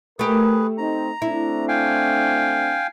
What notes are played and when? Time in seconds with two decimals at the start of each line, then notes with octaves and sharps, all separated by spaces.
0.19 A3 G4 G#4 A#4 B4
0.78 C4 D#4 A#5
1.22 A3 C4 D4 E4
1.68 F5 G5 G#5